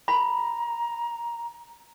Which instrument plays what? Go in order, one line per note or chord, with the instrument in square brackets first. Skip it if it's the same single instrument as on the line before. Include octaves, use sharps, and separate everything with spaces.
[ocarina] A#5 [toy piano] B5